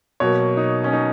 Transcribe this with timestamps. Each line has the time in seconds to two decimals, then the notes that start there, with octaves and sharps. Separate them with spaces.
0.20 B2 F#3 A#3 C#5
0.57 D#4
0.84 C#4
0.93 D#4